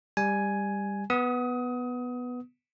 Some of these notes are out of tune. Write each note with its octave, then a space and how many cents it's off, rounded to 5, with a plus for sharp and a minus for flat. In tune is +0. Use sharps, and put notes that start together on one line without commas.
G3 +20 G#5 +5
B3 +0 D#6 +25